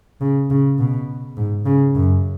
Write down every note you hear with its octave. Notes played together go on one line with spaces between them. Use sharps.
C#3
C#3
B2
G#2
C#3
F#2